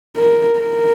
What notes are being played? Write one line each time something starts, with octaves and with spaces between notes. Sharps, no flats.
A#4
A#4